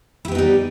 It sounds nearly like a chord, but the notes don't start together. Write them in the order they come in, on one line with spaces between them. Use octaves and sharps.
E4 G4 B3 D#4 G3